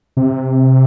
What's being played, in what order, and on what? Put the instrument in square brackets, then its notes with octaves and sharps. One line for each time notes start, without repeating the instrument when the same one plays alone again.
[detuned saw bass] C3